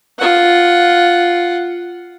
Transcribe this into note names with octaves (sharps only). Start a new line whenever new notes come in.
F4 F#5